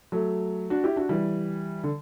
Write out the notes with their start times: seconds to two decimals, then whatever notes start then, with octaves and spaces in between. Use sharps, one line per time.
0.12 F#3 A3
0.70 D4 F#4
0.84 E4 G4
0.96 D4 F#4
1.09 E3 G3
1.84 D3